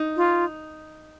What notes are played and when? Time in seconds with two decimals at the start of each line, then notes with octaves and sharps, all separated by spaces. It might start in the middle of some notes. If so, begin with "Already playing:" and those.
Already playing: D#4
0.17 F4